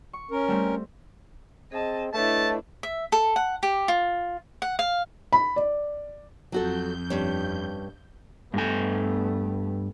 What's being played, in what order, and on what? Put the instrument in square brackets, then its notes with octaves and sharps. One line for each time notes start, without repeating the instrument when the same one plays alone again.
[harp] C#6
[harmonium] C#4 A#4
[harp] G3 A3 C4
[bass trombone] C4 [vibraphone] G#4 [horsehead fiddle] D#5 A5
[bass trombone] A3 [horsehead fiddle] D4 E4 [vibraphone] B4 C#5 D#5 [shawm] A5
[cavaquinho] E5
A4
F#5
G4
F4
F#5
F5
[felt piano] B5
D5
[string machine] F2 G6 [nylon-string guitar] F#3 F#4 A4
[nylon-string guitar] G2 C#4
[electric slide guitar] G2 G#5 [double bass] A3 B3